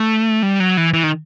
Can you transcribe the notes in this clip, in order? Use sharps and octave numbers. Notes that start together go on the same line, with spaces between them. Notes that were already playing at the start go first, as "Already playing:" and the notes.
Already playing: A3
G3
F#3
E3
E3
D#3